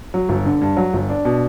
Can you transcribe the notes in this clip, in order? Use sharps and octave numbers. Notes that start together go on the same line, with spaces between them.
F#3
G1
D3
G2
F#3
G1
D4
B2